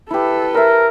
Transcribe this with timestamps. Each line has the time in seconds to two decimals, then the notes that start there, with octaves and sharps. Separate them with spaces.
0.11 E4 G4 A4 B4
0.54 A#4 E5 E6